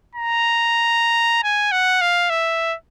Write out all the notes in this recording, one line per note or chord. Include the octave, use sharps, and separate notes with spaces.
A#5
G#5
F#5
F5
E5